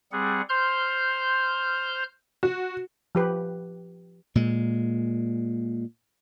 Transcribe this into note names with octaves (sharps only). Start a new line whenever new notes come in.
G3 C4 G#4 F#5
C5 C6 F6 G6
F#4
F3 G4 B4
A#2 G#3